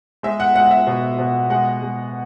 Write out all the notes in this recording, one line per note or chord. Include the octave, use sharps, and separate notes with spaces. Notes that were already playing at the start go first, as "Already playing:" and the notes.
G#3 E5
F#5
G#3 F#5
F#5
E5
B2
B2
G#3 F#5
G#3